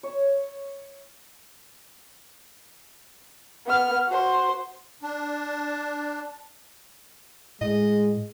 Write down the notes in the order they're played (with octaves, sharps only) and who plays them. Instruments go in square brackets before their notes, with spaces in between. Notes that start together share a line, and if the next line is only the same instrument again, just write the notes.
[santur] C#5 E5
[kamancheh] B3 F6
F#4 C5
[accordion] D4 [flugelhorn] A5
[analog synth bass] A2 [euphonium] G#3 [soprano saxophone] D#5